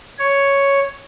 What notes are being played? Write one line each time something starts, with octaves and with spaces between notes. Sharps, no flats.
C#5